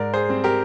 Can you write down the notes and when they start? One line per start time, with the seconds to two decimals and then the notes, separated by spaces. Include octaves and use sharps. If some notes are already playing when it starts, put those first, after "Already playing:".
Already playing: G#2 A#4 D5
0.14 G#4 C5
0.29 G3 C4
0.44 G4 A#4